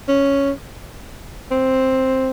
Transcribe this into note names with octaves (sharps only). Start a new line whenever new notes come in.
C#4
C4